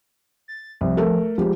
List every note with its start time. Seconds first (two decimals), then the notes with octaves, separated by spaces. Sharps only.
0.48 A6
0.81 C2 F3
0.97 A3 A4 A#4
1.38 F3 G#3 G4